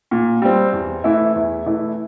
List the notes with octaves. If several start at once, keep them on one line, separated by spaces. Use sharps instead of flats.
A#2
G3 C4
E2
E3 A3 E4
E2
E3 A3 E4